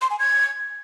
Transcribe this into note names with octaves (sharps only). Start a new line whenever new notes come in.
C6
G#5
G#6